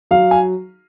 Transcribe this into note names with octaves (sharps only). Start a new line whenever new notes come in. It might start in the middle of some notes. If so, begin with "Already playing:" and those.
F#3 F5
G#5